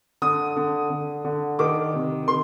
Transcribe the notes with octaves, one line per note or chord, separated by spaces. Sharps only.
D3 D#6
D3
D3
D3
D#3 D6
C3
D#3 C6